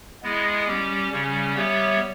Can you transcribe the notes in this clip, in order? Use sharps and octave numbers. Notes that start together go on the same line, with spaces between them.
G#3 B3 E4 G#4 D#5
G3 C#4 G4
C#3 G3 C#4
G3 B3 G4 C#5 E5